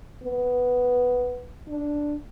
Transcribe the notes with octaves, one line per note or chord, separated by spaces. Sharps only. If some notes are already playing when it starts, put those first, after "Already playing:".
B3
D4